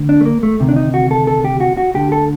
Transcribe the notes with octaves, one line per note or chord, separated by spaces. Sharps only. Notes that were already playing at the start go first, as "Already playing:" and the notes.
Already playing: D2 D3
D4
A3
A#3
A3
D2 C3 D#3
D4
D#4
F#4
A4
A4
G4
F#4
F#4
D2 D3 G4
A4